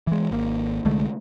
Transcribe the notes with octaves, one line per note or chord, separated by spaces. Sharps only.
E3 G#3
G#1 A#3
C2 D3 G#3 A3